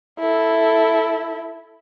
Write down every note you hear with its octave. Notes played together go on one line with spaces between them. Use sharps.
E4 A4